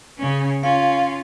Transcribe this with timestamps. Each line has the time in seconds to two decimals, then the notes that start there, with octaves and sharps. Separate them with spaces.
0.18 C#3 C#4
0.63 C#4 F4 F5